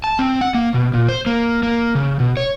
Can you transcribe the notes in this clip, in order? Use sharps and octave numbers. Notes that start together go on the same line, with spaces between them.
A5
C4
F#5
A#3
B2
A#2
C5
A#3
A#3
C#3
B2
C#5